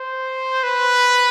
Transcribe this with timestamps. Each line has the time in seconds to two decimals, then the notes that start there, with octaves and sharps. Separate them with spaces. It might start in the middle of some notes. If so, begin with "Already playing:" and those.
Already playing: C5
0.63 B4